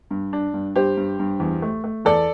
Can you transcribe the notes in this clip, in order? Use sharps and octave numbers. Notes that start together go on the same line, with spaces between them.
G2
D4
G2
G2 G4 C5
G2
G2
E2
A3
A3
E2 A4 D5